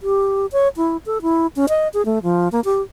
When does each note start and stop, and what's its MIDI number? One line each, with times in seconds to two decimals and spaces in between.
0.02 0.46 67
0.52 0.68 73
0.77 0.97 64
1.06 1.18 69
1.22 1.47 64
1.56 1.66 61
1.69 1.88 75
1.94 2.05 68
2.05 2.19 57
2.23 2.48 53
2.52 2.60 58
2.65 2.81 67